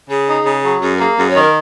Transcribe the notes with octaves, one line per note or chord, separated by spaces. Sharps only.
C#3 G#4
D#4
C#3
F#3
F#2 G#4
A#4
A#3 G#4
F#2 G#4
C#5
D#3
A#4